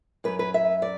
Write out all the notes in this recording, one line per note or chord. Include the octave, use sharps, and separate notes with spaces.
F#2 F#3 B4
B4
E5
D5